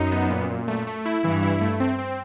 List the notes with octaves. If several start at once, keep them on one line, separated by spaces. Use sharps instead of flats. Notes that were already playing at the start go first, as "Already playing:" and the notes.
Already playing: F#2 D#4
B3
A#2
A#2
A3
A3
E4
G2 E3
E4
A3
C4
C4